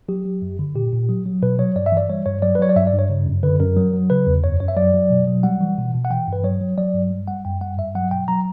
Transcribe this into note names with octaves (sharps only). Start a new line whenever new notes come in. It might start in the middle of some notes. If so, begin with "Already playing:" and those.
F#3 G4
F#3
F#2
D3
A#2 G4
A#2
F#3
F#3
B2 B4
F#3 C#5
G2 D5
E5
E3
D5
G3 C#5
G2 C#5
F#3 D5
B4
F#3 C#5
D5
G2 E5
D5
G2
C#5
C#3
F#2
D3 B4
F#2 A#4
F#3
F#3
C#3 B4
E2
F#2 C#5
F#2 C#5
E5
F#3 D5
F#3
B2
F#3
G3 F#5
E3
B2
B2
F#5
E3 G5
G2 B4
F#3 C#5
F#3
F#3 D5
G2
G3
G3 F#5
F#2 G5
G3 F#5
G2 E5
F#3 F#5
B2 G5
F#3 A#5